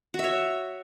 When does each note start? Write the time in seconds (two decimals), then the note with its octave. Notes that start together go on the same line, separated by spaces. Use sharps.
0.14 F#4
0.19 E5
0.24 C#5